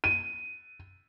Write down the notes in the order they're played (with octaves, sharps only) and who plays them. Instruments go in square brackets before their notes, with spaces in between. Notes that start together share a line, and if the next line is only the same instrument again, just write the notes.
[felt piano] D#7